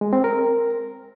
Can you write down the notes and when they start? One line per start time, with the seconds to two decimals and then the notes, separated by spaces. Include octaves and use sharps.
0.01 G#3
0.13 C4
0.24 A#4